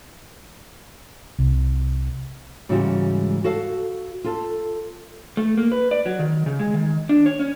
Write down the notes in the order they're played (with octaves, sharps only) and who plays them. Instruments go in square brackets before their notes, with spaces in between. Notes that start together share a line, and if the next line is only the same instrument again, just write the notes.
[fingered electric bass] C2
[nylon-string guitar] G#2 C#3 E3 G3 G#3 F#4
F#4 A4 F5
F4 A4
[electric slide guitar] A3
A#3
B4
D5
F#3
D#3
C#3
G#3
D#3
D4
C#5
C#4